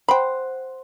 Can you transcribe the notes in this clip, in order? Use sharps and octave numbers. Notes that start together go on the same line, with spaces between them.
C5 F#5 G5 B5